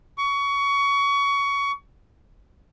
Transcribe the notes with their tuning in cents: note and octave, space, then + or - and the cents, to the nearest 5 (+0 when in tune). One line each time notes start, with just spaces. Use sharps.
C#6 +20